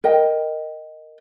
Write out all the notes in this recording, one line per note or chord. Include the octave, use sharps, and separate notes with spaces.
A#4 D#5 G5